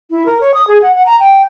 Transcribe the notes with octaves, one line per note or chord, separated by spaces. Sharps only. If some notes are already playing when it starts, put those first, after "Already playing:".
E4
A#4
C#5
D#6
G#4
F#5
F#5
A#5
G5